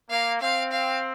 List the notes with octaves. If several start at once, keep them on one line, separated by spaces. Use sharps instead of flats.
A#3 F5
C4 F5
F5